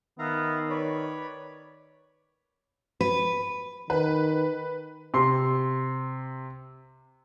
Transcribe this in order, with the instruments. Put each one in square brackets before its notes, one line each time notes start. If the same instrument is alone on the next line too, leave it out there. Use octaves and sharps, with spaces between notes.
[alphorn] D#3 [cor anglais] B3 [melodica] E5 F5 A#5
[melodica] B4 D5 B5 [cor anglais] C#5
[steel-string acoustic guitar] B4
[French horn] D#3 [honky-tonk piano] B4
[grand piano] C3 C6